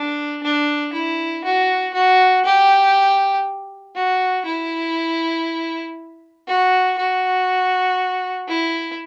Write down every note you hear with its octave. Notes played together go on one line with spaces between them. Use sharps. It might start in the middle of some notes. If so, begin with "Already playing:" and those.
Already playing: D4
D4
E4
F#4
F#4
G4
F#4
E4
F#4
F#4
E4